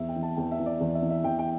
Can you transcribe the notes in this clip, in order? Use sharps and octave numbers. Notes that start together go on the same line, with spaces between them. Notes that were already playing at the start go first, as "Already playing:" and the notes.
Already playing: E2 E5
G5
E3
A5
E2 G5
E5
E3
D5
E2 D5
E5
E3
E5
E2 G5
G5